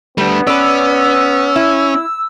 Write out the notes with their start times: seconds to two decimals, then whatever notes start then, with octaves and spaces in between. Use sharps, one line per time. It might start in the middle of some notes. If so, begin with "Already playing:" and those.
0.18 G3 A3 B3 D4
0.47 C#4 B4 D5 E6
1.56 E4